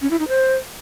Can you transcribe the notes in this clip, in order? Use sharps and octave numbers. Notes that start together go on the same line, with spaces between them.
C#4
E4
D#4
C5